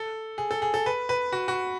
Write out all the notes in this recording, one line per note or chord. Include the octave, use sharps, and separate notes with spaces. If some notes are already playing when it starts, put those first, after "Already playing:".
Already playing: A4
G#4
A4
G#4
A4
B4
B4
F#4
F#4